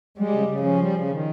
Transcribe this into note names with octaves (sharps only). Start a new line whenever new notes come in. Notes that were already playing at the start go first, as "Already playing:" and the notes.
G3 G#3
C#3
C#3
F3 C#4
G3
C#3
D#3